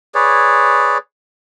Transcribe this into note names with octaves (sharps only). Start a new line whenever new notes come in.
G#4 B4 C#5 D5